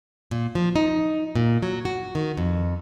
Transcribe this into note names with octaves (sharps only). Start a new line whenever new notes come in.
A#2
F3
D#4
A#2
F#3
F#4
D#3
F2